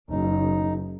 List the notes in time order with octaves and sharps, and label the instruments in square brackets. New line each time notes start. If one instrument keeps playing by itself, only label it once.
[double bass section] F#1 [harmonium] D#4